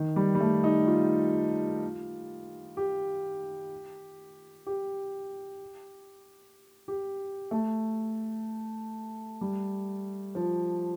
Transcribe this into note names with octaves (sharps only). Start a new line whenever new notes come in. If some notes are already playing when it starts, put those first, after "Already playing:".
Already playing: D#3
G3
G3
A3
D#4
F4
G4
G4
G4
A3
G3
F3